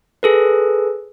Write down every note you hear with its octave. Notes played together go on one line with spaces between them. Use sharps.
G#4 A4 B4